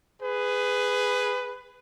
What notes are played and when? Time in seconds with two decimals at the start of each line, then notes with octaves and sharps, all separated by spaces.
0.22 G#4 B4